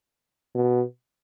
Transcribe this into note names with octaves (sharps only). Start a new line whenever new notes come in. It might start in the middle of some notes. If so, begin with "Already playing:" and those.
B2